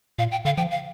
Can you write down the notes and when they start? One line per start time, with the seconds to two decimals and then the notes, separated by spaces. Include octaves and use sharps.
0.18 A#2 F5
0.31 G5
0.45 D3 F5
0.57 F3 G5
0.71 F5